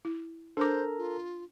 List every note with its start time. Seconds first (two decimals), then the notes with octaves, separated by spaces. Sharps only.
0.05 E4
0.57 D4 A4 A#4 C5 A#5 D6
0.98 F4